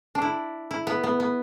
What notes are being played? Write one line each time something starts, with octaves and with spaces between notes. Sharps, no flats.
D4
E4
E4
B3
B3
B3